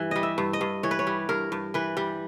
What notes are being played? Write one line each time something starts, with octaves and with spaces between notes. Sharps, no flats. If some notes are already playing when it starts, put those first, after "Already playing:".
Already playing: G2 E3
G3 D#5
E5
G2
D#5
G2
E3 C#5
B4
C#5
G3
G2 A#4
G2
E3 B4
G3